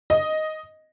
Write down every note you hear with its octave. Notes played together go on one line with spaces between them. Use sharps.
D#5